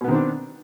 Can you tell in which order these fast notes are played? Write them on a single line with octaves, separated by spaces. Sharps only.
B2 B3 D#3 C4 D4